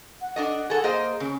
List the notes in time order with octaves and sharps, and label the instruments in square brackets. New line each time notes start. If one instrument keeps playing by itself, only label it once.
[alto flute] F#5
[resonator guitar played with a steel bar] D4 A4 D#5
G#4 A4
[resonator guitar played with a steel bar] A#3 C5 D#5 [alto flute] G#4
[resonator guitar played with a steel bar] C#3 [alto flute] C#4